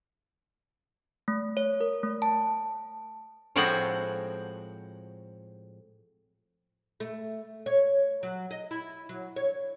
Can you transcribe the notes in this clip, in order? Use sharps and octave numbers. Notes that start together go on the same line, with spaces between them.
A3
C#5
A#4
A3
A5
A2 F3 G#3 C4 F#4 F#5
A3
C#5
F#3
D#5
E4
F#3
C#5